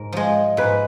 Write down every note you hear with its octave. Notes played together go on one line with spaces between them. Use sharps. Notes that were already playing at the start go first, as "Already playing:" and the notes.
Already playing: G#2 A#4
F3 G#3
G#2 B4